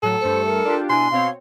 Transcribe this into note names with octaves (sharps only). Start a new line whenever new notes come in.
A2 F#3 A4
G2 A3 C5 C#7
A#4
D4 F4 G4
B2 D4 E4 G#5 C6
B2 C4 C#5 F5